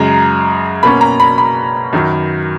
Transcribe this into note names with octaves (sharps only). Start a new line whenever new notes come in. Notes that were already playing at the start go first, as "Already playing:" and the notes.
Already playing: F#2 C#3 G#3 A#5
B2 A#3 C#4 B5
A#5
B5
B5
F#2 D#3 F#3